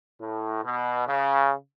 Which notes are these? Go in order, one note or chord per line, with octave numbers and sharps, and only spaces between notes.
A2
B2
C#3